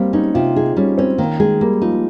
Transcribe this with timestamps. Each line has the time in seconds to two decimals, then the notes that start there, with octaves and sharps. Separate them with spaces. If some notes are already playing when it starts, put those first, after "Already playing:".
Already playing: G3 A#3 C4
0.13 C#4 D#4
0.34 C3 F4
0.56 D#4 G#4
0.76 G3 C#4
0.98 C4 C#4
1.18 D#3 A#3
1.40 G#3 G#4
1.61 G3 A#3
1.81 F3 D#4